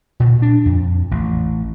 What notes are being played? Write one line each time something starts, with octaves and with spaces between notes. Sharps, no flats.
A#2
D4
F2
A1